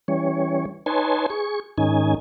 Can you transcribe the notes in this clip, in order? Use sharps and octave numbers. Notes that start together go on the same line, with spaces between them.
E3 G3 C#4 C#5
D#4 B4 C#5 G#5 A5 C6
G#4 C#6
G#2 D#3 C#4 D#4 G#5